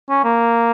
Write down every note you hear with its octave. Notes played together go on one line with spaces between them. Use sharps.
C#4
A#3